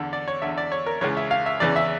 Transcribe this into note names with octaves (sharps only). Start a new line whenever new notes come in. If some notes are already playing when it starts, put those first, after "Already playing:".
Already playing: E2 D3
D5
C#5
E2 D3 E5
D5
C#5
A#4
C#2 C#3 E3 C#5
E5
F5
E5
E2 C#3 E3 D5
E5